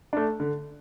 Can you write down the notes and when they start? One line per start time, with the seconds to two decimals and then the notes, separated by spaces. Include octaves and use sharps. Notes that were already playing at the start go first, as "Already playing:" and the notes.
0.13 A3 D4
0.40 D3